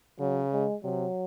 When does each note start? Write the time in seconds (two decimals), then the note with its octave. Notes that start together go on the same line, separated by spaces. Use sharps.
0.20 C#3 F#3
0.52 G#3
0.84 C3 F#3